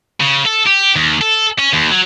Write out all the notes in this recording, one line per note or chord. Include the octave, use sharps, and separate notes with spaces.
C#3
A4
G4
D#2
A4
C#4
D#2
F#3